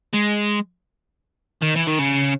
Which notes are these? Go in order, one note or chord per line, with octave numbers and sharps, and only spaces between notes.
G#3
D#3
E3
D#3
C#3